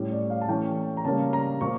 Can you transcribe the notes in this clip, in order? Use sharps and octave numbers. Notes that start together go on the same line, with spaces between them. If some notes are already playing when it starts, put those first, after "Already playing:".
Already playing: A2 G3 C#4
D5
F5
A5
E3 A3 C#4 G5
A#5
C#3 G3 A#3 C#4 A5
A#5
A#2 F3 A#3 C#6